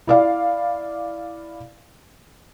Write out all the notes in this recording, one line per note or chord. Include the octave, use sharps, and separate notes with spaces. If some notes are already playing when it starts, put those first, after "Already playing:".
E4 D5 F5